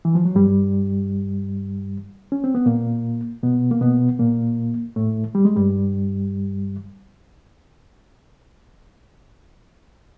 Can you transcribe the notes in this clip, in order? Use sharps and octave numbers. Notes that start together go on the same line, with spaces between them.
E3
F3
F#3
G2 G3
C#4
C4
B3
A#2 A#3
B2 B3
A#3
B2 B3
A#2 A#3
A2 A3
G3
G#3
G2 G3